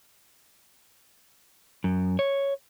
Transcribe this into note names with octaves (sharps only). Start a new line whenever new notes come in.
F#2
C#5